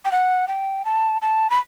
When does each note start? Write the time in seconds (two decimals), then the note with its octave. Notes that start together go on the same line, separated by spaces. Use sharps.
0.05 G5
0.12 F#5
0.48 G5
0.85 A5
1.22 A5
1.50 B5